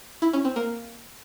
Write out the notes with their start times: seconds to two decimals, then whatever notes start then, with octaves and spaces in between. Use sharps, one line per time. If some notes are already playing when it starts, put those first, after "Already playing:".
0.22 E4
0.33 C#4
0.45 C4
0.56 A#3